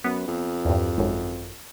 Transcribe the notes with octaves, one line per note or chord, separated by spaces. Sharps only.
F#2 B3
F2
E2 G2
G#1 F#2